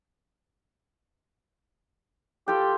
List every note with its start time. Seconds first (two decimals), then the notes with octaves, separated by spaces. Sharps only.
2.48 F4 G4 A4 G5